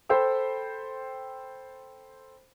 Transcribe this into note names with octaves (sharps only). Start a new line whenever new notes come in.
A4 C5 G5 B5 E6